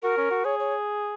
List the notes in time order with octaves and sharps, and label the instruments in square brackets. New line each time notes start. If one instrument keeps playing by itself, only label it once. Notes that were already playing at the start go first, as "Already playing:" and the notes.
[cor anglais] F#4 [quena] A#4
[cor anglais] C#4
F#4
[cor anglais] G#4 [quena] C#5
[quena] C#5